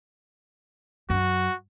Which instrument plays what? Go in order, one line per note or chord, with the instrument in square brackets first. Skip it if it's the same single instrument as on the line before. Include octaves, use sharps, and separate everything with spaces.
[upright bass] F#2 [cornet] F#4